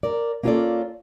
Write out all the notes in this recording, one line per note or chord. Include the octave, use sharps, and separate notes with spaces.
A#4 D5
A#3 C#4 F4 G4 A4 D5